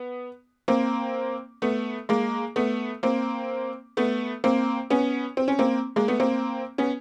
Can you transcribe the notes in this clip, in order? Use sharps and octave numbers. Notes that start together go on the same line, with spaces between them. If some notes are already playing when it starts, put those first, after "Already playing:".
Already playing: B3
A#3 C4
A3 B3
G#3 A#3
A3 B3
A#3 C4
A3 B3
A#3 C4
B3 C#4
C4
C#4
A#3 C4
G#3 A#3
A3 B3
A#3 C4
B3 C#4